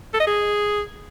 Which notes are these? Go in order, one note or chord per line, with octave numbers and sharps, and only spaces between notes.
A4
D#5
G#4